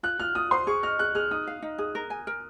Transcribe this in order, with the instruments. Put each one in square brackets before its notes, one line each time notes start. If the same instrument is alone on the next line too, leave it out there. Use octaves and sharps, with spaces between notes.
[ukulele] F4 [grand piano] F#6
[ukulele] F4 [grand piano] F6
[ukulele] F4 [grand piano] D#6
[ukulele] C5 [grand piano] C6
[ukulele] G#4 [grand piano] C#6
[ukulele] D#5 [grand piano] F6
[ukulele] G#4 [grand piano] F#6
[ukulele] G#4 [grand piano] F6
[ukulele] D#4 [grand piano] D#6
[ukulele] F5
D#4
[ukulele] G#4 [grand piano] D#6
[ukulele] A#4
G#5
A#4